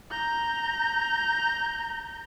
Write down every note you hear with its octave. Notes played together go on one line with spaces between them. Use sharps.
A#5 G6